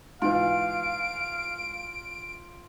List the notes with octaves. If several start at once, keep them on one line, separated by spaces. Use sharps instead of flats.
G#2 E3 F4 F5 D7